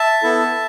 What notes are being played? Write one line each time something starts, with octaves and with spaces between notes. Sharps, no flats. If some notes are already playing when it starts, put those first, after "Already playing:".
Already playing: E5 A5
B3 E4 A4